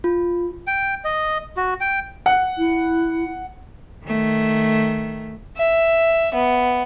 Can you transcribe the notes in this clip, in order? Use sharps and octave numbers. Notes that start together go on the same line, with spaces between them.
F4
G5
D#5
F#4
G5
F#5
E4
D#3 A3
E5
B3